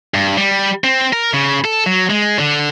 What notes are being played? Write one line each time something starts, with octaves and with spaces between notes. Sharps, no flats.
G2
G3
C4
A#4
C#3
A4
F#3
G#3
D3